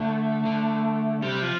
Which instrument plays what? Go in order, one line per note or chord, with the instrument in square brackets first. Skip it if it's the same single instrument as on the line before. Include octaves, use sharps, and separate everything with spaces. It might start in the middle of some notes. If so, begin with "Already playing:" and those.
Already playing: [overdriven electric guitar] D3 [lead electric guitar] A3
[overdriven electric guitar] D3
[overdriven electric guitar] C3 [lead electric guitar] G3
[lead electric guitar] F3